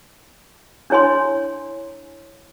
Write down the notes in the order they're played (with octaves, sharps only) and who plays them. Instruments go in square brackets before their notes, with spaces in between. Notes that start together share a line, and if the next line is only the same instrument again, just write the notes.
[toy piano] D4 E4 C#5 G#5 C6